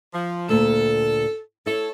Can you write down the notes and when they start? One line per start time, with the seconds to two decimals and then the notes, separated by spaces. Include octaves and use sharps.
0.13 F3
0.49 D2 A#2 A4
1.66 E4 A4 C#5